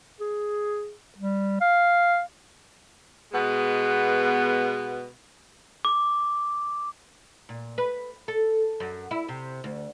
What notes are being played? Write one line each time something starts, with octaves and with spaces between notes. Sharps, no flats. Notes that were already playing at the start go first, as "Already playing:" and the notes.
G#4
G3
F5
B2 G#3 B3
D6
A#2
B4
A4
F#2
E4
C3
D2